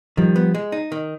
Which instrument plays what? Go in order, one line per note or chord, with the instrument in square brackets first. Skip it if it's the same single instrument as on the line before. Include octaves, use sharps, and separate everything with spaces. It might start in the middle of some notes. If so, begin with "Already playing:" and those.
[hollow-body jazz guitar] D#3 [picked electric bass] F3 G3
[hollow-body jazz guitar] B3
G#3
D#4
D#3